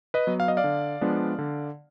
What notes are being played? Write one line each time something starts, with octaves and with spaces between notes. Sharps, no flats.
B4 D#5
F#3 B3
F5
D#5
D5 F5
D3
F3 G#3 B3 D4
D3